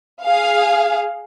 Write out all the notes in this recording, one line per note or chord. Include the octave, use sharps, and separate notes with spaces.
G#4 F5